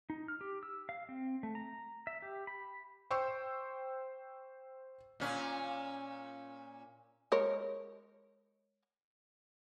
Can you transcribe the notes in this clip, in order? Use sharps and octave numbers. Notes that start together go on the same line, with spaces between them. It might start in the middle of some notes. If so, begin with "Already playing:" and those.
D#4
F6
G4
E6
F5
C4
A3
A#5
E5
G4
B5
C5 G5 C6 C#6 E6
A#2 C#4
G#3 A#4 C#5